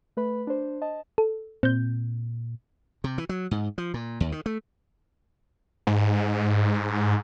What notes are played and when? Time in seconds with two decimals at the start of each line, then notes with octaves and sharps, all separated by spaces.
0.17 A3 B4 B5
0.47 D4 C5
0.82 D#5 A5
1.18 A4
1.63 A#2 C4 G6
3.04 C3
3.18 E3
3.29 F#3
3.51 G#2
3.78 F3
3.94 A#2
4.20 D#2
4.32 D#3
4.46 A3
5.87 G#2